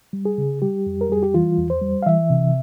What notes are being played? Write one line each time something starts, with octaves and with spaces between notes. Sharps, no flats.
G3
G#4
C#3
G3 G4
F2
A#4
G3 G#4
G4
E3 F4
E2
C5
G3
F5
E3 E5
C3